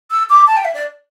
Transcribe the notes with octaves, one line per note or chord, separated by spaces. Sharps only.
E6
D6
A5
G5
E5
D5